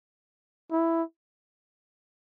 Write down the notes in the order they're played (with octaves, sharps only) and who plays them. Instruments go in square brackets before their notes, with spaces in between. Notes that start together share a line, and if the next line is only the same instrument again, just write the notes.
[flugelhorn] E4